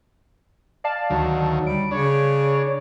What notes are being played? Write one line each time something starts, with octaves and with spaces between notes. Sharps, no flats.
D5 F5 A5
D2 D#3 F#3
G3 D7
C#3 D4 C#5